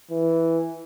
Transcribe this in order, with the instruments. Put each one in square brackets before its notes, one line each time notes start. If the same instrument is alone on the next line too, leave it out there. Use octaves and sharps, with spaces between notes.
[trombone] E3